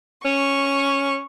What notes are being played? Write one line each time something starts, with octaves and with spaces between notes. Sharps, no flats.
C#4 C#6